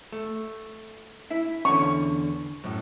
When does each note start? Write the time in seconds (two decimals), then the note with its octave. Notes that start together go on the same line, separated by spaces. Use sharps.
0.12 A3
1.30 E4 E5
1.65 E2 D3 C#4 C#6
2.64 F#2 A2